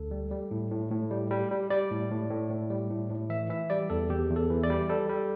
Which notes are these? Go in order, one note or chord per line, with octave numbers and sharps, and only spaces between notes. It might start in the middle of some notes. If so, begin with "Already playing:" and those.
Already playing: D2 A4
G3
G3
A2
A2
A2
G3
G3
G3
G3 D5
A2
A2
A2
A2
G3
A2
A2
E3 E5
E3 E5
G3 D5
E2 A4
E2 G4
E2
A4
E3
D5
G3
G3 A4
G3